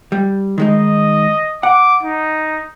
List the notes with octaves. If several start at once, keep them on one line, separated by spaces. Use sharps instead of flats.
G3
D#3 G#3 D#4 D#5
F#5 D6
D#4